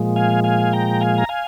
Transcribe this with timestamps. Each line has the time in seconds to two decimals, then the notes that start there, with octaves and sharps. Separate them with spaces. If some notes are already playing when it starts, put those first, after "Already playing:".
Already playing: A#2 F3 G#3
0.16 F5 G#5
0.44 F5 G#5
0.73 G5 A#5
1.01 F5 G#5
1.18 A#5
1.29 F5 G#5